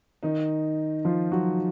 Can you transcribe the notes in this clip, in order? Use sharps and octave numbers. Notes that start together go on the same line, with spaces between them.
D#3 D#4
F3 F4
F#3 F#4